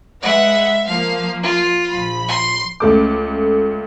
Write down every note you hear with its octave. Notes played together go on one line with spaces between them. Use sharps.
G#3 B4 E5 F#5
F3 A#3 F5
F4
A#1 F3 B5
C6
C#2 A3 D6